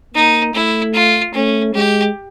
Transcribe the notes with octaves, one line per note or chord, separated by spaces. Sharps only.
A#3 D#4
A3 E4
F4
A3 C#4
G#3 G4